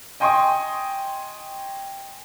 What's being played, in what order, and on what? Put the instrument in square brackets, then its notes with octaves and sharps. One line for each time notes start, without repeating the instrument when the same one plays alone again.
[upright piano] D#5 G5 G#5 C6 C#6 D#6